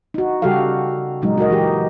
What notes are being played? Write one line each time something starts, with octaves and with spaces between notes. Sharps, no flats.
D#4 F#4
C#3 G3 F#4 G4 A4 F5
A#2 C#3 F#3 G#3 D#4
F#4 G#4 A#4 D#5
E3 G4